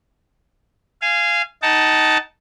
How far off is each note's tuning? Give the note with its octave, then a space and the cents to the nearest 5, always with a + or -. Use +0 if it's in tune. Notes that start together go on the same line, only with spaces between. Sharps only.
F5 -20 G#5 +0
D#4 +10 F#5 +40 A5 +0